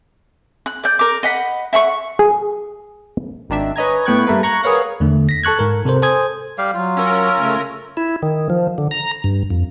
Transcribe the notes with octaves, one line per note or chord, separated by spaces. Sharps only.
F#6
D5 G6
A#4 D6
D#5 F#5 B5
E5 F#5 B5 C#6
G#4
G#1 D#3 D4 E5
B4 C#5 D#5 G#5 A#5 G#6
A2 B3 G5 C#6 F#6 G#6
G2 A3 A#3 B4
A#5 C#6 F#6 G#6
G#4 A#4 B4 C#5 F5 F#5
E2 D3 A3
A#6 B6
A4 A5 C#6 F#6 G#6
G#2 A#4
C3 A4 A#4 C5
A4 C5 G#5 D#6 G#6
G3 G4 F5
F#3 F4
C#4 A#4 E6
C#3 A3
E4
D#3
F3
D3
A#5
G2
F2